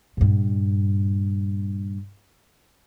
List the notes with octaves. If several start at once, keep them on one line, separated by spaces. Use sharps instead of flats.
G2 A#2